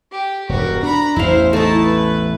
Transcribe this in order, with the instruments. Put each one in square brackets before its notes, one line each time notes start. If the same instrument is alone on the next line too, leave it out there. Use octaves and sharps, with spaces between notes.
[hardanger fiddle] G4
[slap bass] E1 G2 [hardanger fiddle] F#4 A#4
[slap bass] D4 [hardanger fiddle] A#5 B5
[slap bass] A1 E2 [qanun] E4 F5 [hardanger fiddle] C5 E5
[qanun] A3 E4 [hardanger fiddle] D#4 A5
[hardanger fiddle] B4